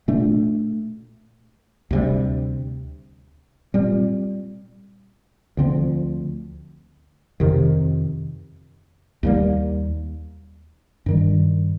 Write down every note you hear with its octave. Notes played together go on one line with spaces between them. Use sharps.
A#2 A3 D4
D2 C3 G3
A#2 G3 C4
D2 D3 F3 C4
F2 C3 D#3
D#2 D3 G3 A#3
G2 D#3 G3